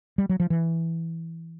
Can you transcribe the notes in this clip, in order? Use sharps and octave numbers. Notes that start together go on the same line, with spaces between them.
G3
F#3
F3
E3